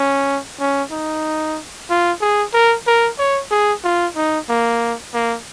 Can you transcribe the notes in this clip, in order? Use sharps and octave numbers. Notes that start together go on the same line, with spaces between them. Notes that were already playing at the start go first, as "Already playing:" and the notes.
Already playing: C#4
C#4
D#4
F4
G#4
A#4
A#4
C#5
G#4
F4
D#4
A#3
A#3